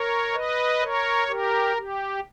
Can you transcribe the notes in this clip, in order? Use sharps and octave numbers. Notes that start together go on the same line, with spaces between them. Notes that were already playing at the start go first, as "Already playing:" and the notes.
Already playing: A#4 C#5
B4 D#5
A#4 C#5
G4 A#4
G4